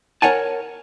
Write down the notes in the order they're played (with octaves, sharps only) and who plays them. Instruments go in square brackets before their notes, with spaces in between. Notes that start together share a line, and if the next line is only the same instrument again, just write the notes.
[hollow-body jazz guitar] A#4 C#5 F#5 G#5 A5